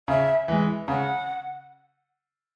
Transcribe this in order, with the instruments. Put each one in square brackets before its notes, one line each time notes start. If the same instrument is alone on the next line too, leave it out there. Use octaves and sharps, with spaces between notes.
[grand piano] C#3 [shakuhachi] E5
[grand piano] E3 G#3
[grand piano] C#3 [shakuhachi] F#5